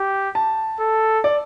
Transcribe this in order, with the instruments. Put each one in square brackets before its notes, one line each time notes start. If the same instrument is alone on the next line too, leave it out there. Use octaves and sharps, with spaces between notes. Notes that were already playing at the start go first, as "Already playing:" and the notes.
Already playing: [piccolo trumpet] G4
[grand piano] A5
[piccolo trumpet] A4
[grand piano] D5